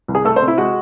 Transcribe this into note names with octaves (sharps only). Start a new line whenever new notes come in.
C2
G#4
A3 A4
C5
C3
E4
G#3 F#4